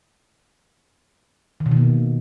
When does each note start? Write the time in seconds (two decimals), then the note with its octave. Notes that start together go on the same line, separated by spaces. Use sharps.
1.60 D#3
1.66 B2
1.71 D#3
1.77 A#3